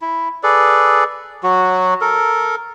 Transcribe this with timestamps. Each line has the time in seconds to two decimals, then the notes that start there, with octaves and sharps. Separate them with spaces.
0.02 E4
0.43 G#4 A4 B4 D5
1.43 F#3 F#4
2.01 A4 A#4